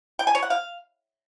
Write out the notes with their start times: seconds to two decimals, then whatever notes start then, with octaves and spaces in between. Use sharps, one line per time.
0.19 G5
0.27 G#5
0.35 C#5
0.43 F#5
0.50 F5